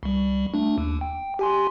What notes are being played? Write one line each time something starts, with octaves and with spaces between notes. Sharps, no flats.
C2 G3
A3 D4
D#2
G5
G4 G#5 C6